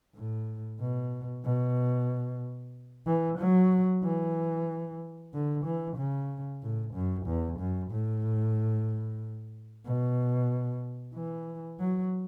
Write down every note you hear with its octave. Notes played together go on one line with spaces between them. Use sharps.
A2
B2
B2
E3
F#3
E3
D3
E3
C#3
A2
F#2
E2
F#2
A2
B2
E3
F#3